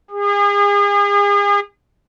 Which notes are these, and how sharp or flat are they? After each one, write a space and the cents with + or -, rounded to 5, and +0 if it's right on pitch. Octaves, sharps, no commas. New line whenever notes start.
G#4 -40